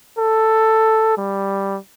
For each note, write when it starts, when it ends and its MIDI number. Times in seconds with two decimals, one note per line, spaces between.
0.19 1.16 69
1.18 1.78 55